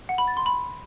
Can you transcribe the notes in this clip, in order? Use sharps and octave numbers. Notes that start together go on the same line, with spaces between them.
F#5
B5
A6
C6
B5